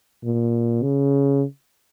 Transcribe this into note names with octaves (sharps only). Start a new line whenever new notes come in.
A#2
C#3